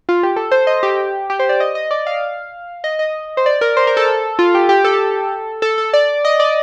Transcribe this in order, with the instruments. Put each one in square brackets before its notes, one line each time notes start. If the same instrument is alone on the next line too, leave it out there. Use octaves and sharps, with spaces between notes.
[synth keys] F4
G4
A4
C5
D#5
G4
G4
C5
D5
D#5
D#5
D5
F5
D#5
D#5
C5
D5
A#4
C5
A#4
A4
F4
G4
G4
A4
A4
A4
D5
D#5
D5